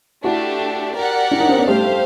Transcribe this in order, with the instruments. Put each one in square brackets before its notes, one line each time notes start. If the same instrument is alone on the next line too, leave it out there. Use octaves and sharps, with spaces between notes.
[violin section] A3 D4 G4 [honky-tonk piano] E4 F#4
[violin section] G4 A#4 D5 F#5
[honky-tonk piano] D4 E4
C#4 D#4
C4 D4
B3 C#4
[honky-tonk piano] G3 A3 [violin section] G4 C5 F5